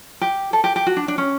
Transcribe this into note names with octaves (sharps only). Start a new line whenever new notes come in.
G4
A4
G4
G4
F#4
D4
D4
C#4